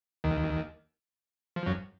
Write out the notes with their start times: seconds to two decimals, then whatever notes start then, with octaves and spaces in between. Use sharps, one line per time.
0.24 D#2 D#3
1.56 F3
1.66 F#2 F#3